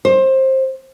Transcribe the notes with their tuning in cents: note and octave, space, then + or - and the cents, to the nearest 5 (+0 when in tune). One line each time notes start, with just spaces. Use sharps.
C5 +20